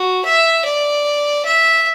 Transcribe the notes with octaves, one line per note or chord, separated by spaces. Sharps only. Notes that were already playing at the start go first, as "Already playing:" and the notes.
Already playing: F#4
E5
D5
E5